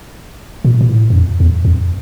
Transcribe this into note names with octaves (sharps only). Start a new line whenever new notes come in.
A#2
A#2
A2
F#2
F2
E2
F2